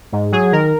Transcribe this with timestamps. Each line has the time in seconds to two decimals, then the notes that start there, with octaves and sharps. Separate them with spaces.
0.12 G#2
0.32 F#3 G#4
0.52 D#3 A#4